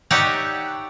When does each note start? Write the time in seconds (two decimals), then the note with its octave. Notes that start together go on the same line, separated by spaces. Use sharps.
0.11 D#4 G4 C#5 D5 E5 F#5